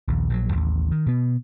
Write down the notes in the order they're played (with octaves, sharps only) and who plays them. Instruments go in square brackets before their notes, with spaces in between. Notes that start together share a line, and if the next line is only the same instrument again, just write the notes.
[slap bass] A#1 D#2
A#1 D3 F#3
A1 D#2
D#3
B2 B3